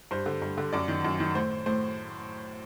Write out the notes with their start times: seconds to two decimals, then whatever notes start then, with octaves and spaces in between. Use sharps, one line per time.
0.11 G2 C5
0.26 D3
0.42 G2
0.58 D3
0.73 F#2 D5
0.88 D#3
1.05 F#2
1.20 D#3
1.35 A2 C5
1.66 A2 C5